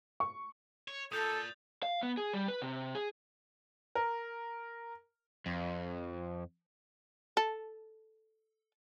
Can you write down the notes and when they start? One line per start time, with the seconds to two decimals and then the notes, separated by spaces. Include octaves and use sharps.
0.20 C#6
0.88 C#5
1.12 A#2 A4 D#6 G6 A6
1.83 F5
2.03 B3
2.17 G#4
2.33 G3
2.48 B4
2.62 C3
2.95 G#4
3.95 A#4
5.46 F2
7.37 A4